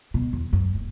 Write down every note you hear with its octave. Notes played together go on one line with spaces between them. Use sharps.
B2
E2
F#2
D#1